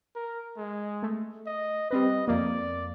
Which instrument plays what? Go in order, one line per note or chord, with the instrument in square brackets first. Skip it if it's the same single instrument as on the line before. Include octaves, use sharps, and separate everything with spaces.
[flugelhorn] A#4
G#3
[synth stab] A3
[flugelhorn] D#5
[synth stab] G3 C4 B4 [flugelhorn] D#5
[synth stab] F2 A#3 [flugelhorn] D5